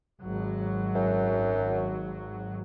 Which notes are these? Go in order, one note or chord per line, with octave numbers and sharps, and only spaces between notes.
G#1 F#3
F#2